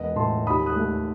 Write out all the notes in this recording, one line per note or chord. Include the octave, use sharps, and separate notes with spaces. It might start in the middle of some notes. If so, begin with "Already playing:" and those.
Already playing: E1 B3 D#5
A2 A5 C6
D#2 B5 D#6
D#6 F#6
A3